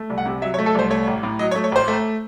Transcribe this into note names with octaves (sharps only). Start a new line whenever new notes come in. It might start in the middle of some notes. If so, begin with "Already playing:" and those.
Already playing: A3
C2
F#5
C3
F#3 E5
C#5
A3
A4
C2 C5
A3 C#5
A1
A2
F#3 D#5
C#5
A3
C#5
A1 C5
A3